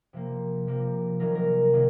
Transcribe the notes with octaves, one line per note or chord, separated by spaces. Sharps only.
C3 F3 A#3
C3 F3 A#3
C3 D#3 F#3 A#3 A#4
A#4
C3 D#3 F#3 A#3